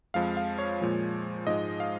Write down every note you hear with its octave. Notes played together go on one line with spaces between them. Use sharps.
F2 F3 G#3 F5
F5
C#5
A#2 F3 G#3
G#2 F3 G#3 D#5
F5